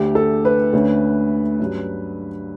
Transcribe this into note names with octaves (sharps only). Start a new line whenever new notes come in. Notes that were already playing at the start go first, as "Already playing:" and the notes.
Already playing: D2 D3 A3 G4
A4
B4
D2 D3 A3 C#4
G2 F#3 C#4